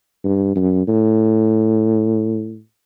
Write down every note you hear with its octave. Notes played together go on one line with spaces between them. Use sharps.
G2
F#2
A2